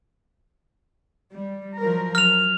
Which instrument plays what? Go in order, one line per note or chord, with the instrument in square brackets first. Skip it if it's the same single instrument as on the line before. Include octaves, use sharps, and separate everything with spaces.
[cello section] G3
F3 F#3 A#4
[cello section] F#3 [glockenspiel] F6 F7